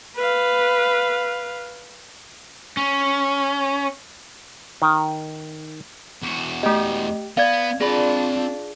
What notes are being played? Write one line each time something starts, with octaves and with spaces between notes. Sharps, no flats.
B4 F5
C#4
D#3
E2 F#4
A3 G4 D#5
B3 D5 F5 G#6
C4 D4 F4 G#4 D5 B5